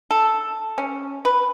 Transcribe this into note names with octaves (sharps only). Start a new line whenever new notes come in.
A4
C#4
B4